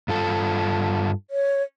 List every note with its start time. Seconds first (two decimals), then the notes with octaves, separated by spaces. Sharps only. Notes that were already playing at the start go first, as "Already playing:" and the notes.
0.08 G2 F4 A4
1.31 C#5